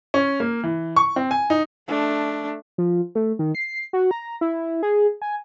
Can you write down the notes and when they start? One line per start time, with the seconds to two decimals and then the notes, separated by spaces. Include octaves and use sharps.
0.14 C#4
0.40 A#3
0.64 E3
0.96 C#6
1.16 C4
1.31 G#5
1.50 D#4
1.88 A3 D4
2.78 F3
3.15 A3
3.39 D#3
3.55 C7
3.93 F#4
4.11 A#5
4.41 E4
4.83 G#4
5.22 G#5